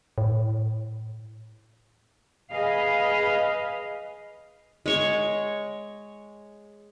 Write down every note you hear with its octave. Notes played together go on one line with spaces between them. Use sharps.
A2
G#4 B4 D#5 F5
G#3 C#5 C#6